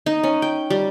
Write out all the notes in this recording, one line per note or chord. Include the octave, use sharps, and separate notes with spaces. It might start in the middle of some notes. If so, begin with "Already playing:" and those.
D#4
C#4
G5
G3